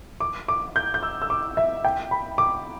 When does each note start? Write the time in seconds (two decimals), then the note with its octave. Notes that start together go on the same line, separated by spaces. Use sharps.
0.20 D6
0.48 D6
0.76 G6
0.94 G6
1.03 E6
1.22 E6
1.30 D6
1.57 E5
1.85 G5
2.11 B5
2.38 D6